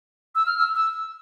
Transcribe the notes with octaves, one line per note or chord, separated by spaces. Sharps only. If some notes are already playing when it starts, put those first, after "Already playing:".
E6
F6
E6
E6